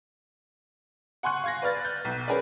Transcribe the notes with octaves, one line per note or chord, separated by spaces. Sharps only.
F#5 G#5 C6 C#6 F#6
F5 G#6 A#6
B4 D5 F6 A6
F#6 G6
B1
C#4 G#4 A#4 B4 D5